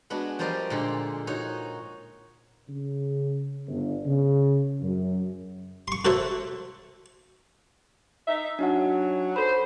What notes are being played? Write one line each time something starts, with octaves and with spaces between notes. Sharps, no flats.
G#3 B3 D4 F#4
F3 G3 A#4 C5 D5 D#5
A#2 D3 G#3
D#4 F#4 C#5
C#3
G1
C#3
F#2
C6 C#6
F#4 A4 A#4 C5 C#5 E5
D#4 E5
F#3 D4 D#4 F#5
A4 C5 B5